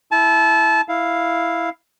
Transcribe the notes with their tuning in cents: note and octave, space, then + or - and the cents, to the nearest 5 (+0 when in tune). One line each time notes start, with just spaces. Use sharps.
E4 +0 A5 -25
E4 +0 F5 +0